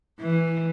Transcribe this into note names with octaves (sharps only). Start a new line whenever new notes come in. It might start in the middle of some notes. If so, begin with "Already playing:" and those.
E3